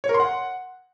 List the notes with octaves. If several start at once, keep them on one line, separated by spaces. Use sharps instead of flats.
C#5
A#4
C6
F#5